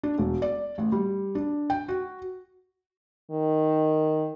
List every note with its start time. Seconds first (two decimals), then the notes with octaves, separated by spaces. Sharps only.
0.03 D4
0.18 E1
0.42 D5
0.78 A1
0.92 G3
1.35 D4
1.70 G5
1.88 F#4
3.31 D#3